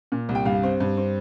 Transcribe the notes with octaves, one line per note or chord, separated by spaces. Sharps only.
A#2
C2
G5
G2 F5
C4
G2
C4